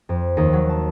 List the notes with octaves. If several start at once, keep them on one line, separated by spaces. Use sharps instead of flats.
F2
D#2
F#3
A5